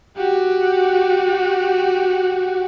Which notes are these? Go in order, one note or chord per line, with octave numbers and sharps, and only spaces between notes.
F#4 G4